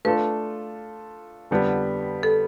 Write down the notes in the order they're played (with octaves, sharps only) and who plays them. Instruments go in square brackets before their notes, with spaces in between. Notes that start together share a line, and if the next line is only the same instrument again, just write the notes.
[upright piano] A3 D4 F4 A4 [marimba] B4
[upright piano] F2 D3 G3 B3
[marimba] A4